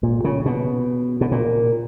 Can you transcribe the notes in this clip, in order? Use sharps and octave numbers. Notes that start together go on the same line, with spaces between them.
A#2
C#3
B2
B2
A#2